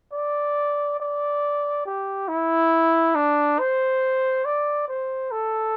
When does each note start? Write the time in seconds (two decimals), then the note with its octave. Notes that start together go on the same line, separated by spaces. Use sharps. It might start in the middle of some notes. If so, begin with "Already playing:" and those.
0.13 D5
1.00 D5
1.86 G4
2.28 E4
3.15 D4
3.59 C5
4.45 D5
4.88 C5
5.32 A4